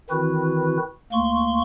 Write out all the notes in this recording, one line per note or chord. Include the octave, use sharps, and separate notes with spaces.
D#3 E3 C4 E4 F#4 B4
D2 A#3 C6 C#6